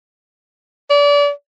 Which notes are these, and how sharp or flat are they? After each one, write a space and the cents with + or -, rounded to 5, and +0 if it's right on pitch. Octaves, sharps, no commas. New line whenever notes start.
D5 -30